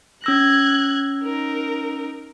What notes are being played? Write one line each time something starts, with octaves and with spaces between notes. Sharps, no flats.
C#4 E6 F#6 G#6 A#6
D#4 A#4